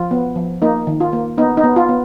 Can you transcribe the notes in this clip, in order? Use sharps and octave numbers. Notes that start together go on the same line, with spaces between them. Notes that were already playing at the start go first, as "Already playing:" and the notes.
Already playing: F3 F4
B3
F3
A#3 D#4
D#3
F4
A#3
B3 D#4
D#4
B3
F4
B3